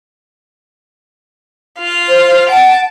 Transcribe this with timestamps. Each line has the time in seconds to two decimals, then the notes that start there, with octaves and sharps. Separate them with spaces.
1.79 F4 F5
2.08 C5
2.49 F#5 A5 D7